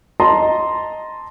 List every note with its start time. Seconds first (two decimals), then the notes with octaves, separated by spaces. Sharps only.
0.20 D#5 A5 A#5 C6